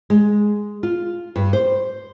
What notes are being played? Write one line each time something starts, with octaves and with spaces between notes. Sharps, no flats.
G#3
F4
G2
C5